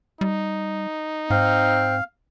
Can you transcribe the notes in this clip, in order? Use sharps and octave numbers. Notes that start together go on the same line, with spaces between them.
G3 D#4
G#2 C4 F5